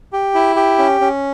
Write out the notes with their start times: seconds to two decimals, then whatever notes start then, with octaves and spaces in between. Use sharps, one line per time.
0.13 G4
0.35 E4
0.56 G4
0.78 C#4
1.01 C#4